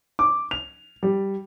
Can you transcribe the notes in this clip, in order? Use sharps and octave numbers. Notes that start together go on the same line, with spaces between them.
D6
F7
G3